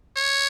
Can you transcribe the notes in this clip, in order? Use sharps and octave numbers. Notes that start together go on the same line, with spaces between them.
C#5